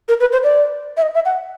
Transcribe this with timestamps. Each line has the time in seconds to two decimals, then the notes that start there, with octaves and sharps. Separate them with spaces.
0.08 A#4
0.20 B4
0.32 C5
0.43 D5
0.97 E5
1.02 D#5
1.15 E5
1.25 F#5